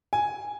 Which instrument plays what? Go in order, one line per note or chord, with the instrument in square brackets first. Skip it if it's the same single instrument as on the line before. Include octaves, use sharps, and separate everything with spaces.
[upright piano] G#5